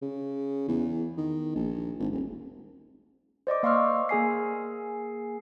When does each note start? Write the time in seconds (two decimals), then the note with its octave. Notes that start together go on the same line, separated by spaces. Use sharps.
0.02 C#3
0.68 E2
1.17 D#3
1.55 A#1
2.00 G#1
2.12 D#1
3.47 C5 D5 D#5 D6
3.63 A#3 F5 C6 C#6 E6 F6
4.09 A#3 G#4 G#5 C7